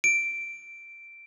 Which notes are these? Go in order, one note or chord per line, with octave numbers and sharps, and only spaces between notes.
D7